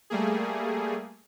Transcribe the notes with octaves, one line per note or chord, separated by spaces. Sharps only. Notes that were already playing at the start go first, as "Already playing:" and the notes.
G3 A3 A#3 G#4